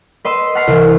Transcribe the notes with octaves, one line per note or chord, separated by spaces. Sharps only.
B4 D#5 C6 D#6 E6
F#5 A5 C#6 F6 B6 C7
C2 E3